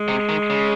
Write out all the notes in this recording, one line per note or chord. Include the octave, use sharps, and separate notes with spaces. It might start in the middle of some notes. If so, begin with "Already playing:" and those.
Already playing: G#3
C3
D#3
C#3